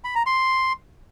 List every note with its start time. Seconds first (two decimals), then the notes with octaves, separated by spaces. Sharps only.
0.04 B5
0.15 A#5
0.26 C6